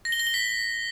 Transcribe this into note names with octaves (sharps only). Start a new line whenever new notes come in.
A#6
G7
A#6
G7
B6